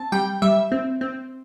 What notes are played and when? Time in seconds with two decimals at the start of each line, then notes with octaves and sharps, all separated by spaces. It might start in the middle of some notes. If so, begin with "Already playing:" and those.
Already playing: C4 A5
0.12 G3 G5
0.42 G3 E5
0.72 C4
1.01 C4